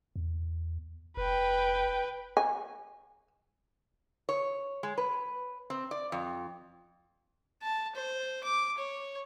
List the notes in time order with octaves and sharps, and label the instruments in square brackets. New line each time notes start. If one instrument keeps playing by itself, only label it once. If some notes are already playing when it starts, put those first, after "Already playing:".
[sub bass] E2
[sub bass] F1 [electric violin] B4 G5
[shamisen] G#5
[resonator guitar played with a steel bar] C#5
G#3
B4
C4
D5
F2
[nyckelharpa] A5
C5
D6
C#5